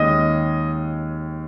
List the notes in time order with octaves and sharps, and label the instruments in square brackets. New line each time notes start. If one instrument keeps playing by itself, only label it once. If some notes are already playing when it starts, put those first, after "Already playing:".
Already playing: [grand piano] D#2 D#3 G#3 C#4 D#5